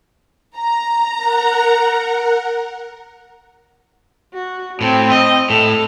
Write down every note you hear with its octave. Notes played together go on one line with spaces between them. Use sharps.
A#5
A#4 F#5
F#4
A2 C4
D#5
A2 A4